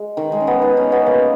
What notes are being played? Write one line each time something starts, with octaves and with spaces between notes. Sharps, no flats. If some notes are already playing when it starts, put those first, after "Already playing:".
Already playing: G#3
D#3
G#3
C#4
B3
D#4
C#4
B3
A#3